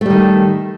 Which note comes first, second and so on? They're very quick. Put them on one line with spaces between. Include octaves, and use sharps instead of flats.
A3 G3 D#3